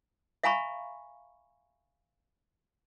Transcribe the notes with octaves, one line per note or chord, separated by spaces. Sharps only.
E5 F5 G#5 A#5 B5 C#6